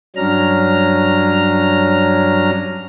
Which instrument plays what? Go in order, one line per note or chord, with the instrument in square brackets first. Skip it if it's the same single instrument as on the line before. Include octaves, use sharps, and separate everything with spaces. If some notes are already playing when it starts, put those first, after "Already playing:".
[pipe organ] G2 F#3 C#4 D4 A#5 F6